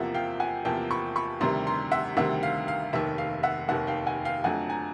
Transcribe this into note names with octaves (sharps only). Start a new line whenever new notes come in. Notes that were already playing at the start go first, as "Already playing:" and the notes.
Already playing: E2 C3 F3 A#3 E5 F#5
F5 G5
F#5 G#5
E2 C3 F3 A#3 G5 A5
B5 C#6
B5 C#6
D2 C3 D#3 G3 A#5 C6
A#5 C6
E5 F#5
D2 C3 D#3 G3 E5 F#5
F5
F5
F1 D#2 D#3 E5
F5
E5 F#5
F1 D#2 D#3 E5 F#5
F5 G5
F#5 G#5
F5 G5
F2 D3 F#3 A3 F#5 G#5
G#5 A#5